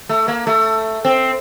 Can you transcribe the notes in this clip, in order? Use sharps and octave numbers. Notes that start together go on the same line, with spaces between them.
A3
A#3
A3
C4